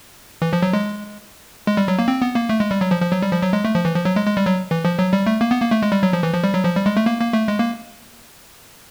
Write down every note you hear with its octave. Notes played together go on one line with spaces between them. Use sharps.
E3
F3
F#3
G#3
G#3
G3
F#3
A#3
C4
B3
A#3
A3
G#3
G3
F#3
F3
F3
F#3
G3
F3
F#3
G#3
A3
F3
E3
F3
F#3
G#3
G#3
G3
F#3
E3
F3
F#3
G3
A3
A#3
B3
A#3
A3
G#3
G3
F#3
F3
E3
F3
G3
F#3
F3
G3
G#3
A3
A#3
A#3
A3
G#3
A#3